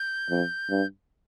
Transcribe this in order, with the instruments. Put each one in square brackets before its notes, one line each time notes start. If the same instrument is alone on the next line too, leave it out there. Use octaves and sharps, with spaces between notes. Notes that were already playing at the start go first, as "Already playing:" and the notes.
Already playing: [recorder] G6
[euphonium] F2
G2